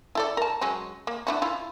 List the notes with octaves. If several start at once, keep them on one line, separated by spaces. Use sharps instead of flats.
E4 A4 D5
A#4 A5
F#3 G#3 C#4
A#3
D4 E4 F#4
E4 F4